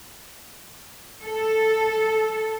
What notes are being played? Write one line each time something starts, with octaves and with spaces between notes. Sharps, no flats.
A4